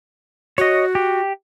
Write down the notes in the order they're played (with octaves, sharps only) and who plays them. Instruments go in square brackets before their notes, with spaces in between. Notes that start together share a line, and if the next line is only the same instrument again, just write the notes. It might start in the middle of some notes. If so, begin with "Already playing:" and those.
[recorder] F#4 [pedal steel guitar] C#5 D#5
[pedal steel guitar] G4